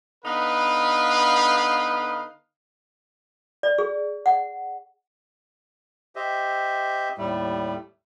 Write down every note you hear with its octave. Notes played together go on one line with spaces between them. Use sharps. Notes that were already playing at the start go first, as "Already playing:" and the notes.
D3 B3 D#4 B4 F5
D5
G#4
F#5
G4 C5 D#5 E5
D#2 A2 G3 A3